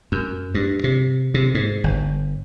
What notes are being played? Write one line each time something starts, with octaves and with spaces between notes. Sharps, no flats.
F#2
G2
C3
C3
G#2
G1